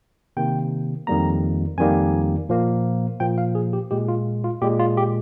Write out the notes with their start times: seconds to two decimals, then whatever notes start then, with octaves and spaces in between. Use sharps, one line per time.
0.37 C3 D#3 A#3 G5
1.07 F2 D#3 G3 A#3 A#5
1.78 F2 D#3 G3 A#3 G#5
2.49 A#2 F3 A#3
3.20 A#2 F3 A#3 G5
3.38 F5
3.55 G#4
3.73 G4
3.91 A#2 G#3 G4
4.08 F4
4.44 F4
4.62 A#2 G#3 G4
4.79 F4
4.97 G4